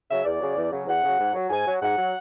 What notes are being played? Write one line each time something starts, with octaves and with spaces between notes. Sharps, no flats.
C#3 F#3 E5
E2 D5
C#3 F#3
E2
C#3 F#3
E2 F#5
C#3 F#3
G#2
F#3
G#2 G#5
F#3
G#2 F#5
F#3